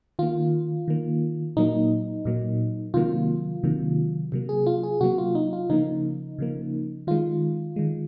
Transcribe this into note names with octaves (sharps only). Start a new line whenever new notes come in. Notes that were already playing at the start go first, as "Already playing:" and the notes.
D#3 A#3 F4
D#3 A#3
A#2 F#3 A#3 D#4
A#2 F#3 A#3
C3 D#3 F#3 A#3 F4
C3 D#3 F#3 A#3
C3 F#3 A#3
G#4
F4
G#4
C3 F#3 A#3 F#4
F4
D#4
F4
C#3 F3 A#3 D#4
C#3 F3 A#3
D#3 G#3 F4
D#3 G#3